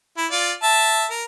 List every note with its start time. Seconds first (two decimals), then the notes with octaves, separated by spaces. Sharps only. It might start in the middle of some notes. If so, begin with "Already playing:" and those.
0.17 E4
0.31 F4 D5
0.63 E5 A5
1.10 A#4